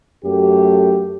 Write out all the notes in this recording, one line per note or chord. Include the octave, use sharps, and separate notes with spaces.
F#2 A3 G4